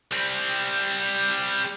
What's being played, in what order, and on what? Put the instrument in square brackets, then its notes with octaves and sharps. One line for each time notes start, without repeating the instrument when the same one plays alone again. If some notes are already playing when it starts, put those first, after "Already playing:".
[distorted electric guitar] G3 C4